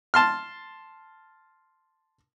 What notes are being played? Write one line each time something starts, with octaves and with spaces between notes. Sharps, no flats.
A5 C6 F6